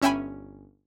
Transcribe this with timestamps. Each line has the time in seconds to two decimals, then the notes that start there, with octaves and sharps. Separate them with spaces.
0.02 G1 C#4 E5 G5 G#5 B5